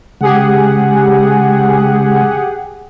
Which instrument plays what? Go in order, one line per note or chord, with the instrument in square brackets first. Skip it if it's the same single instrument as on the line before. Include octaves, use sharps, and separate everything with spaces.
[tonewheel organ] C#3 G#3 [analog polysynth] G4 G#4 F#5